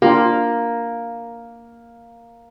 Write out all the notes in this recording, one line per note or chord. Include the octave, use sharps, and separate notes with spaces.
A#3 D4 F4 G4